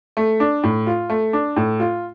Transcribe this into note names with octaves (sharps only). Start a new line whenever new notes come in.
A3
D4
A2
F4
A3
D4
A2
F4